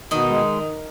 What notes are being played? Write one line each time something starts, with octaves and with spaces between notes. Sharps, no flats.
B2 D#3 D#4
G#3